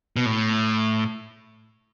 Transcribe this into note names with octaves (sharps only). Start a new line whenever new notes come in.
B2
A2